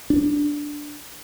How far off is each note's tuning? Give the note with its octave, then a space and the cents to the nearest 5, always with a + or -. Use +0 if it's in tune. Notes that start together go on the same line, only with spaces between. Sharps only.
D4 +0